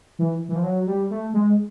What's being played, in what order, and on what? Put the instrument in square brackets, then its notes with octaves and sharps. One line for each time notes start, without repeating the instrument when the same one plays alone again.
[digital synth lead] E3
E3
F3
F#3
G3
A3
G#3